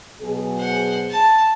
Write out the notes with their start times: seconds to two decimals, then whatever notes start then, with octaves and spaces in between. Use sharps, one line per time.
0.20 B2 F#3 G#4
0.57 C5 F#5
1.10 A5